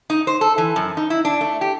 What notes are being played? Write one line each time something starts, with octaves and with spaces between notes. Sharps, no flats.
D#4
C5
A4
E3
F#2
D#4
E4
D4
A3
G4